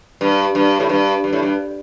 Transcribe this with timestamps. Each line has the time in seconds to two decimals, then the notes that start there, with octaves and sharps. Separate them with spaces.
0.21 G2
0.55 G2
0.80 A2
0.89 G2
1.24 G2
1.33 A2
1.42 G2